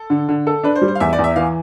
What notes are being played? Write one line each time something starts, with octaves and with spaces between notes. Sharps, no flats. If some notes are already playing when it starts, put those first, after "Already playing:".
Already playing: A4
D3
D3
A4
D4 B4
C5
G3
C5
F5
E2 E5
D5
E2
E5
E3 F5